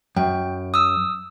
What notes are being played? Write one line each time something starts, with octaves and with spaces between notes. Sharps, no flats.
F#2 G5
D#6 E6